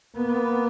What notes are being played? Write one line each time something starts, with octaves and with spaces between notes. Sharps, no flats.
A#3 B3